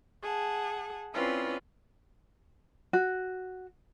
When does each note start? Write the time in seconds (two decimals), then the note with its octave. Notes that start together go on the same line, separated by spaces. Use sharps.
0.22 G#4 F#5 A5
1.14 C4 C#4 E4 F4 B4 D5
2.93 F#4